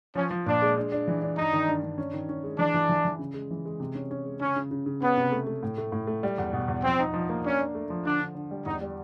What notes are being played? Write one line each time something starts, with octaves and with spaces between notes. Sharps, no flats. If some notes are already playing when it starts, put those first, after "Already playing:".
F3 C#4
F3
A#2 D4
G#3
D4
D4
E3
D4
G2 D#4
D#3
G2
G2
C#4
D#3
C#4
G#3
E3 D4
E3
E3
E3
C#3
G#3
E3
G#3
C3
C#4
C#4
G#3
C#3 C#4
C#3
C#3
C#3
B3 C#4
C3
A3
A3
A2
A3
A2
A3
G3
E2
B2
E2
F3 C4
D#4
F3
A#3
C#4 D4
D4
A3
F3
D3 D4
D3
D3
G3
E2 D#4
G3